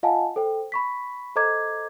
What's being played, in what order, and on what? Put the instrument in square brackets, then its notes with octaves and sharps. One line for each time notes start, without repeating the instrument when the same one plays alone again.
[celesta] F4 D#5 F5 F#5 G#5 A5
A4 C5 G5
B5 C#6 B6
A4 C5 D#5 A#5 D6 G#6